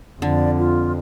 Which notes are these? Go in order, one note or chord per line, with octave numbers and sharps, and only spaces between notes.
F2 D3 D5
F4